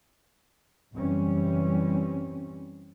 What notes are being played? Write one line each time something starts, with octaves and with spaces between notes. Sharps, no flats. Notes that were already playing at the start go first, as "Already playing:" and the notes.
F#1 E3 G3 C4 C#4